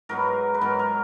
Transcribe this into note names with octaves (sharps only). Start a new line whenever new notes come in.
G#2 F#3 B3 A#4
B4
G#2 F#3 B3 A#4
A#4